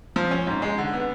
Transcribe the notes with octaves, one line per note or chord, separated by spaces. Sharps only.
F3
C#4
G#2
G#3
D3
B3